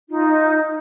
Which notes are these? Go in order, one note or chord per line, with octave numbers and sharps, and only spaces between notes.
D#4 F4